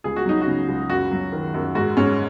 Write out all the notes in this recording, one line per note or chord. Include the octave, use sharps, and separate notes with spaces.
C#2 G#4
F#4
F#3 D#4
F#4
C#3
C#2
F#2 F#4
F#3
D#3
F#2
G#2 F#4
G#2 C#4